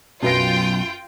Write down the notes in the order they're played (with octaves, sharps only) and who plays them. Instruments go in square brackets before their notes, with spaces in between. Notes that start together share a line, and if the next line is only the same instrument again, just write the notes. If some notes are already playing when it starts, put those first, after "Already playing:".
[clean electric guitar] B1 [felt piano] F#2 B4 A#6 [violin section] F4 G5